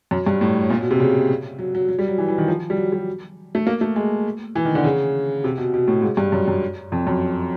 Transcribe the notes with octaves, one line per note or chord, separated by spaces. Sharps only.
F#2
G2
A2
A#2
B2
C3
C#3
F#3
F#3
F#3
G3
F#3
E3
E3
D#3
F3
G3
F#3
G3
A3
A#3
A3
G#3
E3
D#3
D3
C#3
C3
B2
B2
A2
G#2
G2
F#2
F#2
F2
F#2